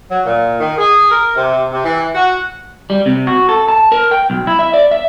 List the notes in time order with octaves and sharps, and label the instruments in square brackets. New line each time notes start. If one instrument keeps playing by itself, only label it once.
[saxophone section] F#3
A#2
D#3
G#4
A#4
C3
C3
E3
F#4
[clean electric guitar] G3
C3
F#4
A4
A5
A#4
G5
B1
E4
E5
D5
E5